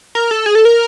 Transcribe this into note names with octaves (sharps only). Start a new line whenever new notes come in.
A#4
A4
G#4
A4
A#4